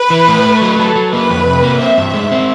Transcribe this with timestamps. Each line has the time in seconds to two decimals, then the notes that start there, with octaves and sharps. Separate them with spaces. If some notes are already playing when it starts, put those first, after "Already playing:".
Already playing: B4
0.10 E3
0.28 A2
0.45 A3
0.62 F#3
0.79 F#3 A4
0.96 F#3
1.12 A#3 B4
1.30 F2
1.47 C3
1.63 A#3
1.81 C4 E5
1.98 G2
2.14 G#3
2.31 C4